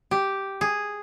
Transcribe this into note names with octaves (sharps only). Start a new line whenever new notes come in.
G4
G#4